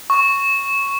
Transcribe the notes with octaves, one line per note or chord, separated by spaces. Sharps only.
C#6